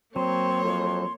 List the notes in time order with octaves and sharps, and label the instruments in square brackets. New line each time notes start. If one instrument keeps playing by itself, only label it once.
[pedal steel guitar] F#3 [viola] A#3 C#5 [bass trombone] C4 [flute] C6
[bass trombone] F2